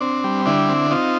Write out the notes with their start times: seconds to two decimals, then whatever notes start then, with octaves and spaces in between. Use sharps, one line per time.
0.01 C4 D4
0.24 G3
0.45 D3 D4 E4
0.69 C4
0.91 C4 D#4 F4